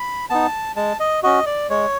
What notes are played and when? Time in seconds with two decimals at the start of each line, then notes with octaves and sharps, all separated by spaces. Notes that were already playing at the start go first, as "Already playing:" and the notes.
Already playing: B5
0.30 B3 D#4 A5
0.76 G#3 A5
1.00 D#5
1.23 C#4 F#4 D#5
1.46 D5
1.70 G#3 C#5